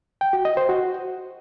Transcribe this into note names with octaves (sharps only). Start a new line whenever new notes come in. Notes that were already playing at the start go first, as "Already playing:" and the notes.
G5
F#4
D#5
C5
F#4